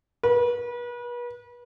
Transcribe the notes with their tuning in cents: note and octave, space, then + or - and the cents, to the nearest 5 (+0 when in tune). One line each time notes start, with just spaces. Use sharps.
B4 -35